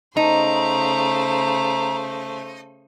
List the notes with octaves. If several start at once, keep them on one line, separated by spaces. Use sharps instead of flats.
C#3 A3 D#4 C5 A#5